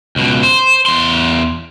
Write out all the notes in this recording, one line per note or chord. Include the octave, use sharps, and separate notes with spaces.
C#2 B2
C5
E2 C6